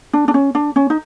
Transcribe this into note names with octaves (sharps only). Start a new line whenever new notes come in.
D4
D4
C#4
D4
C#4
D#4